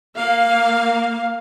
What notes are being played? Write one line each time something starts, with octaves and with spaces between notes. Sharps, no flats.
A#3 F5